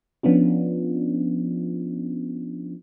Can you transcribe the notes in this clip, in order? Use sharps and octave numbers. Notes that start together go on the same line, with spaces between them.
F3 B3 C#4 D4 F4